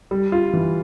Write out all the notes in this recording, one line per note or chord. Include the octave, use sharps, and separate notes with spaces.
G3
F4
E3